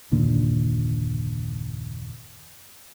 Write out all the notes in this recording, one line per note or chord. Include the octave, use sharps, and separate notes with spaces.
F#1 D#2 A#2 D3